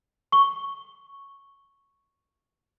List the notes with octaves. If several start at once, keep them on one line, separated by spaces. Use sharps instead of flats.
C#6 G7